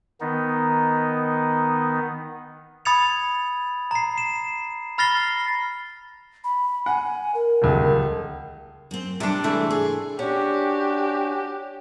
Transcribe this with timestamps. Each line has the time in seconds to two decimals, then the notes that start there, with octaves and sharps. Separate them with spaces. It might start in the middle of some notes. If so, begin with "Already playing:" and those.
0.21 D#3 B3 D#4
2.85 B5 D#6 G#6 A6 C#7 F7
3.91 A#5 C7
4.18 E7
4.98 B5 F6 A6 A#6 C7 G7
6.44 B5
6.86 F#5 G#5
7.35 A#4
7.62 D#1 C#2
8.91 F#2 C4
9.20 C3 G3 D4 D5
9.44 G#2 E3 G#3 A3 C4
9.70 G#4
10.19 C#4 D4 F#4 G4